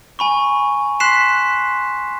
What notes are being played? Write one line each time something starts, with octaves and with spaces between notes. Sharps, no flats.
G#5 B5 C#6
C6 F#6 B6 C7 E7 F7